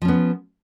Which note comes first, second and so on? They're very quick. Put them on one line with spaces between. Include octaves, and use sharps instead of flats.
F3 C#4 B3